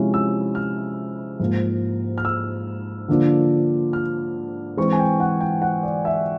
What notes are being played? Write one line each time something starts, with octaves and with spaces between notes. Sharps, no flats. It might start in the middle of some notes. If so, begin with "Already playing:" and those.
Already playing: C3 F3 G#3 C#4 E4
E6
F6
G#2 F3 A#3
F6
E6
D3 F3 A#3 D4 F4
F6
E3 G#3 C4 C#6
G#5
G5
F#5
G5
F#5
D5
E5